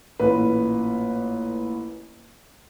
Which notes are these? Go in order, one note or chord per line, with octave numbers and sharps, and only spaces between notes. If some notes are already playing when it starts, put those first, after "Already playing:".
A1 A#2 B4